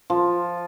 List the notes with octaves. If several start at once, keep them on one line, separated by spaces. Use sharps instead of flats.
F3